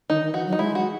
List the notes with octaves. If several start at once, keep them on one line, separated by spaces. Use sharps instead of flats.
D#3 D#4
D#3
E3 F#4
F#3
D#4
G#3 E4
F#4